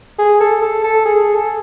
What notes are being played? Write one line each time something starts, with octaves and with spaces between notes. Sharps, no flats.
G#4
A4
A4
A4
G#4
A4